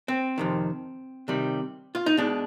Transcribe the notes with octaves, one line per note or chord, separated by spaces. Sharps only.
C4
F2 C3 D#3
C3 D#3 G3
F4
D#4
B2 G#3 D4